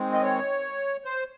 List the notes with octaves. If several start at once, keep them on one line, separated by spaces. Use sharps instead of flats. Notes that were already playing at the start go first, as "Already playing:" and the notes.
Already playing: D#3 G#3 C4
D#5
C#5
C5